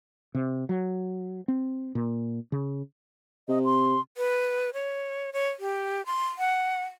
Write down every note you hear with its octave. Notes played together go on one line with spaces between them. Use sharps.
C3
F#3
C4
A#2
C#3
C3 D#5
C6
B4
C#5
C#5
G4
C6
F#5